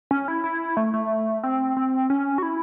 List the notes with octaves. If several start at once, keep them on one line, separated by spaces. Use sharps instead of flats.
C#4
E4
E4
A3
A3
C4
C4
C#4
F#4
E4